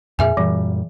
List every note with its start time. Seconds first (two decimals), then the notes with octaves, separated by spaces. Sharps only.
0.19 F2 A#2 G#4 E5 G#5
0.37 F#2 A#2 E3 G3